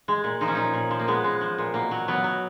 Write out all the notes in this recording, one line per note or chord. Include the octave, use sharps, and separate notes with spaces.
G#3
A#2
F3 D#4
C#4
A#2 D#4
A#2
F3
A#3
G#3 B3
G#3
F3
A#2
B2 A#3
F#3
F#3 B3
F#3